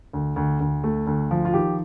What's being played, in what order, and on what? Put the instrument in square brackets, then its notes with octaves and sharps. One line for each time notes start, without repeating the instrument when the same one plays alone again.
[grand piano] D2
D2
D2
A3
D2
F3
F4
D#3 G4